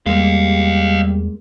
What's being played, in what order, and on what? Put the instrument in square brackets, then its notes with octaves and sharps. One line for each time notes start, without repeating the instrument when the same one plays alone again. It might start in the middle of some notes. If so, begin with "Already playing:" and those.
[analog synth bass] E2 [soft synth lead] G3 [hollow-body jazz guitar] G#3 A#3 [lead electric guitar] D#5 F5